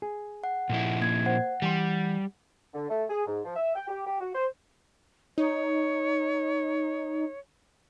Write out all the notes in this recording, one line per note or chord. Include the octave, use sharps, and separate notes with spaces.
G#4
F#5
A#2 F3 E4
A#3 G#6
C5 F#5
E3 G3 A5 C6
D3
A3
G#4
G#2
F3
E5
G5
G4
G4
F#4
C5
D#4 C#5